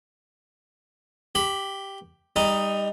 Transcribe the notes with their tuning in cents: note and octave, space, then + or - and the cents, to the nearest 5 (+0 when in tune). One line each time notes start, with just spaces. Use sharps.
G4 +0 B5 +15
G3 +25 D#4 +0